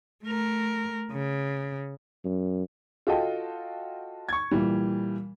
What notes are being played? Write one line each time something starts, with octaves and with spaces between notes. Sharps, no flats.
A3 A#4
C#3
F#2
F4 F#4 A4 D#5 G5 A5
C#6 G#6
A#2 E3 G3